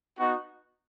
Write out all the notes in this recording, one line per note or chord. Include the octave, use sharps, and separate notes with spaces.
B3 D#4 F#4